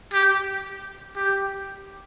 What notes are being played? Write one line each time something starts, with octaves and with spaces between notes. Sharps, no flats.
G4
G4